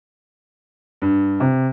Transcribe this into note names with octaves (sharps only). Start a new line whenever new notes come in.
G2
C3